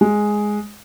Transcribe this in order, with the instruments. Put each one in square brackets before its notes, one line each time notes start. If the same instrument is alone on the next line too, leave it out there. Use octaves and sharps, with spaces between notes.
[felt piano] G#3